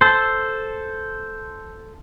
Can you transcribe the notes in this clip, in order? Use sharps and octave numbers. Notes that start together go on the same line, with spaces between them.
A4 C5